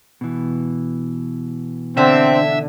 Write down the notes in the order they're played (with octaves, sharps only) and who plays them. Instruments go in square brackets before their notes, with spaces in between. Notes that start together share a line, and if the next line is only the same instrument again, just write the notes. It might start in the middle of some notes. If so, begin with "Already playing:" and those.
[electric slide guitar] B2 E3
[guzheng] D3 [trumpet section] C4 [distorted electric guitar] E5